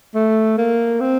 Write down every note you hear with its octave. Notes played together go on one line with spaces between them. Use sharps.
A3
A#3
C4